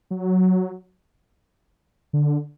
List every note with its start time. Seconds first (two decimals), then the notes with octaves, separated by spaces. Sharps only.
0.11 F#3
2.13 D3